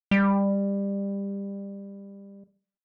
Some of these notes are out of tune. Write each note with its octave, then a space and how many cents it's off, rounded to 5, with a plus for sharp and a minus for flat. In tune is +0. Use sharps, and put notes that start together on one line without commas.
G3 +20